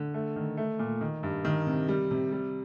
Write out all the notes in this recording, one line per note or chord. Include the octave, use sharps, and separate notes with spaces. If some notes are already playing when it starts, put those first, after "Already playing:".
Already playing: D3
A3
D#3
A3
A#2
D#3
G2
D#3
C3
G3
C3
G3